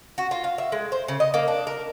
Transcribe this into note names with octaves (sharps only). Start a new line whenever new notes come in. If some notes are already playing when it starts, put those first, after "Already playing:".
F#4
F4
F5
E5
G#3
C5
C#3
D#5
A#3
D4
A#4